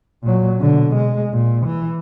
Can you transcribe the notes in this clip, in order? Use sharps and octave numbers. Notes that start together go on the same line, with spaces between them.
A#2 F#3
B2 D3
G#3
A#2
E3